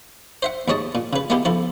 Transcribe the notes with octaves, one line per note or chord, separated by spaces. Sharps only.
C5 E5 F#5
D#2 G#2 C#5 D#5 A5
A#2
C#3 B4
G#3 A#3 B3 E4 G4
F3 E4 A4